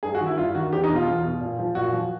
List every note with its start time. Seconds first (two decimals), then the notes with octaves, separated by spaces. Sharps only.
0.03 G2 G#4
0.15 F#4
0.20 D#3
0.26 E4
0.37 G2 F4
0.55 D#3 F#4
0.72 E2 G4
0.84 D#4
0.90 B2
0.95 F4
1.06 E2
1.24 B2
1.41 A#2
1.59 F3
1.75 A#2 F#4
1.93 F3